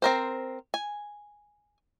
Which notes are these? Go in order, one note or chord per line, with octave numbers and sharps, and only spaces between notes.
C4 A#4 C5
G#5